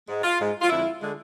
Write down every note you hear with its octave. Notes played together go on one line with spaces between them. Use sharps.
G#2 G#3
F4
G#2 G#3
F4
F2 D3 G#3 E4
D3 G#3